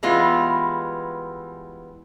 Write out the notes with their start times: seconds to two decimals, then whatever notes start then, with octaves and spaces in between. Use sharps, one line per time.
0.03 E3 G3 G#3 B3 E4 F4